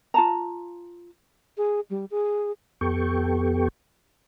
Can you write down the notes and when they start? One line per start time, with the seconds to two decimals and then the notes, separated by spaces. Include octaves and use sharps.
0.14 F4 A5 A#5
1.57 G#4
1.90 G3
2.11 G#4
2.81 F2 B3 G4 A4 G5 C#6